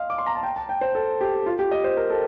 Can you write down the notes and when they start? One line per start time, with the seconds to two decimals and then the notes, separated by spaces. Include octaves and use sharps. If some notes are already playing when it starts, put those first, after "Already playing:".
Already playing: D#5 F5 C6
0.10 D6
0.18 C6
0.26 A#5
0.35 A5
0.43 G5
0.56 A5
0.69 G5
0.81 C5
0.95 A4
1.21 G4
1.46 F4
1.59 G4
1.71 D#5
1.84 C5
1.97 A#4
2.10 A4